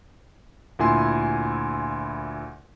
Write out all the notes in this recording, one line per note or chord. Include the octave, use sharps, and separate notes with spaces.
D2 A#2 E4 G#5 C6